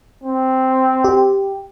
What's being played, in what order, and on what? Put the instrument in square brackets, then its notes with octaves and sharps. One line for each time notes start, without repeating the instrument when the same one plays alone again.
[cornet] C4
[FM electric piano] G4